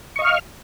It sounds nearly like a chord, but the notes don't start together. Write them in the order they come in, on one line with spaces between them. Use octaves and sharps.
C#6 D#5 F5 F6